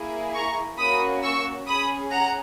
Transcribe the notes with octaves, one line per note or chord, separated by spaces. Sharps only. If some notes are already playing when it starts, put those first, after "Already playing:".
Already playing: A#3 E4 G#4
A#5 C#6
A#3 C#4 F#4 B5 D#6
C#6 E6
C#4 G#4 B5 D#6
F#5 A#5